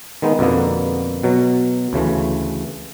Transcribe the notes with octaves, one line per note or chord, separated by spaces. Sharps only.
D#3 G#3 B3 D#4
F2 B2 D3 A#3 B3
B2 F#3
D2 C#3 E3 A3